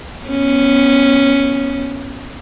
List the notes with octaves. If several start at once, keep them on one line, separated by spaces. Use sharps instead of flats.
B3 C#4